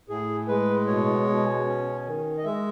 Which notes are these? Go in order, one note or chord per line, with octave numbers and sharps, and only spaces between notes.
A2 G#4
G#3 B4
B2 C#5
B2
C#4
D#3
D#5
G#3 E5